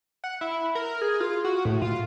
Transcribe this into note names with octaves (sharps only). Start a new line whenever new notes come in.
F#5
E4
A#4
G#4
F4
F#4
A2
F4